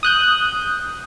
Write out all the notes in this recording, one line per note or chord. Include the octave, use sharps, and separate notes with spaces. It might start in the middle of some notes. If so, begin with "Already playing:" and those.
D#6 F#6 G6